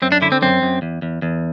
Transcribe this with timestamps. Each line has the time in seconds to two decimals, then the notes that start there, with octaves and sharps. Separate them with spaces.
0.02 F#2 C4
0.12 D4
0.22 D3 E4
0.32 C4
0.42 F#2 C4
0.62 F#2
0.82 E2
1.02 E2
1.22 E2